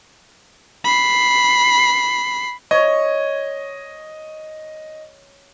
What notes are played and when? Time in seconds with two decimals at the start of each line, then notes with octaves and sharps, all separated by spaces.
0.84 B5 C7
2.71 C#5 D#5